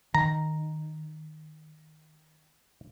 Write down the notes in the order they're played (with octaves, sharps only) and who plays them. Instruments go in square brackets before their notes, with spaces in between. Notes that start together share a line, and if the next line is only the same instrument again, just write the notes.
[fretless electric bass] D#3 [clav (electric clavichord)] A#5